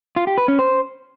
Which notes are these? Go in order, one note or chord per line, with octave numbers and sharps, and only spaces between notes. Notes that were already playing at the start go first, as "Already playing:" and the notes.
F4
G4
B4
C#4
C5